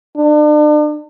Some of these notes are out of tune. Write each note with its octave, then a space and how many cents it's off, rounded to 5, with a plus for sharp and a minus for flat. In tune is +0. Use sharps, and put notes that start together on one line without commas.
D4 +35